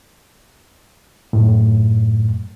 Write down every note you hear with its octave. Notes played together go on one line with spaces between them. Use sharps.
F#2 A2